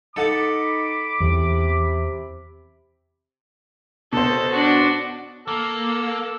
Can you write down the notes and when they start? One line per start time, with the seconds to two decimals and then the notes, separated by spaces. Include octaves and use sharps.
0.16 D#4 A4 F#5 A5 B5 D6
1.20 E2 C3
4.13 B2 A4 C5
4.52 D4 F#4
5.48 A#3 A4